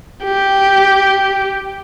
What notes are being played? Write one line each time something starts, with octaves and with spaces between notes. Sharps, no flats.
G4